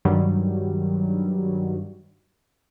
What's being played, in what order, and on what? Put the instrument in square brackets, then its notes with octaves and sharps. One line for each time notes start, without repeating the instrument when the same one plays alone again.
[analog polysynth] G2 D#3 F#3 G3